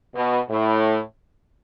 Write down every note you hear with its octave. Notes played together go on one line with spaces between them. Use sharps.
B2
A2